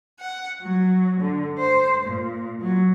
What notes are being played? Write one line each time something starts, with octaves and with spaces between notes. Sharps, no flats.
F#5
F#3
D3
C5
A#2
F#3